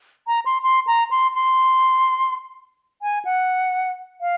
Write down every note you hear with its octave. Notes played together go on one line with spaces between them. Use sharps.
A#5
C6
C6
A#5
C6
C6
G#5
F#5
F5